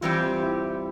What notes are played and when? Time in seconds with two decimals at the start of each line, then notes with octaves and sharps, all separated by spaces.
0.01 E3 G3 C4 F4 G4
0.17 F4
0.43 E4